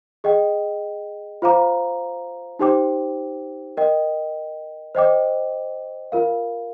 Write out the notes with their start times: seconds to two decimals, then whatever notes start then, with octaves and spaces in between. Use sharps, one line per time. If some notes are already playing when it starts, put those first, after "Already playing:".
0.24 G#4 D#5 G5
1.42 F4 C5 F5 A#5 D6
2.59 D#4 G4 C5 G5 D6
3.77 A#4 D#5 G5
4.95 C5 D#5 G5 D6
6.12 F4 A#4 F5